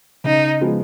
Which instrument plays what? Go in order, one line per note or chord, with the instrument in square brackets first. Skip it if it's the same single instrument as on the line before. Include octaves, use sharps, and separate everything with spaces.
[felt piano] C#3 [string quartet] D#4
[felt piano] F3 G#3 B3